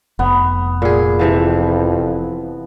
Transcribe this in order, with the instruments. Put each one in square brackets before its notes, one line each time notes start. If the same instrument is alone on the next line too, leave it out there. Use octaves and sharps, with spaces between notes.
[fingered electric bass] F1 [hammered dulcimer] B3
[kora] A#2 G#4
[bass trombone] F2 [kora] C3 E3 F3